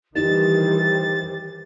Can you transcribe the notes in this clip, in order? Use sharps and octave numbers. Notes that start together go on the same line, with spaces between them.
D#3 E3 G3 D#4 G4 C5 A6